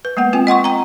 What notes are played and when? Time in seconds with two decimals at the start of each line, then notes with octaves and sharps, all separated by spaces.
0.05 B4
0.17 G#3 A#3 B3 F#5
0.33 C4 F4 G5 G#5
0.47 D#5 F#5 C6 C#6
0.64 G5 A#5